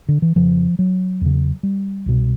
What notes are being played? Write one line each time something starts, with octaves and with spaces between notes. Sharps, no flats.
D3
E3
F2 C#3 F3
F#3
E2 C#3
G3
C2 B2